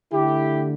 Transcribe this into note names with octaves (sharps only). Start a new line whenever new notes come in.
D3 A3 E4 G4